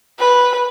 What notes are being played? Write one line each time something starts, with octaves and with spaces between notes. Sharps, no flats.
B4